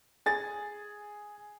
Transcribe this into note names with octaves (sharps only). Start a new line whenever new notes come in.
G#4 A6